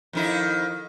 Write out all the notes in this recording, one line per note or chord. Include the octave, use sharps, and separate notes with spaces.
F2 D#3 E4